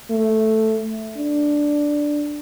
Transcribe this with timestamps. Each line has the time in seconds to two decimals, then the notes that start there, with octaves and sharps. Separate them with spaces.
0.11 A3
1.17 D4